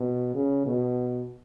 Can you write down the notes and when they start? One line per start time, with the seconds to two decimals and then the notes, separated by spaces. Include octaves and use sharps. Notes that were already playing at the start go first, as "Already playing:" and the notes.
Already playing: B2
0.35 C#3
0.66 B2